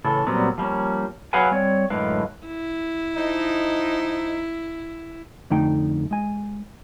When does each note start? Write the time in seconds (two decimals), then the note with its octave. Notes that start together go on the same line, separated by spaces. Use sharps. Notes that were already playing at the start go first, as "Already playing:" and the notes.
0.04 A2 C#3 E3 A4
0.27 A#2 F#3 G3 B3 C4
0.58 F3 G3 A#3 C#4
1.33 F#3 G#4 B4 F5 F#5 G#5
1.51 G3 C4 C#5
1.90 F#2 A2 D3 G#3 B4 F5
2.46 E4
3.16 F3 D#4
5.50 F2 D3 A3 D#4 G5
6.11 G#3 G#5